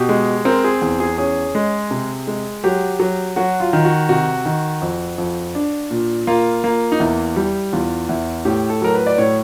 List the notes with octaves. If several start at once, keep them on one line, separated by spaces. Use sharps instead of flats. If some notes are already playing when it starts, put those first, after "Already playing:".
Already playing: B2 G4
G#3
C4 A#4
G#4
E2 G#4
G#4
C#4 G#4
G#3
C3
G#3
F#3 G4
F#3
F#3 F#4
F4
D#3
F#4
C3 F#4
D#3
F2
F2
D4
A#2
A#3 F4
A#3
D#4
E2 E4
G3
E2 F4
E2 E4
A2 G4
A4
F#3 A#4
B4
D5
A2 C#5